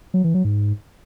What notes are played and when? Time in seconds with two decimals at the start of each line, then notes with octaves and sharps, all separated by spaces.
0.14 F#3
0.24 E3
0.34 F#3
0.45 G#2